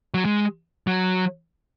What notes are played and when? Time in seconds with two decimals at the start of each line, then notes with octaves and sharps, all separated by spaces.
0.14 F#3
0.25 G#3
0.87 F#3